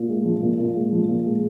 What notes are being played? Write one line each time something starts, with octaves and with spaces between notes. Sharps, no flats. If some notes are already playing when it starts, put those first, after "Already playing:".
Already playing: A#2
G#3
F3
A#2
A#2
G#3
F3
A#2
G#3